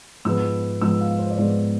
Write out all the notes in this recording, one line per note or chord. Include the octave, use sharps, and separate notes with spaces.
G#2 F3 G#3 B3 E6
G#2 F3 G#3 B3 E6
F5
C5
D5
G#2 F3 G#3 B3 C5